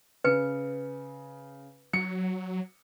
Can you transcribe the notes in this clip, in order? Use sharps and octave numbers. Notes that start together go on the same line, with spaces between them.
C#3 B4 C#7
F#3 C#7